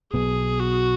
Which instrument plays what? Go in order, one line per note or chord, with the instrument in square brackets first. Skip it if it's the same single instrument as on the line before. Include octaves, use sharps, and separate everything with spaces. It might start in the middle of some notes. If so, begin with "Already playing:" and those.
[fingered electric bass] B1 B2 B3 [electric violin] G#4
[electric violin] F#4